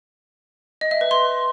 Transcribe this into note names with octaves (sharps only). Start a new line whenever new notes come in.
D#5
E5
B4
C6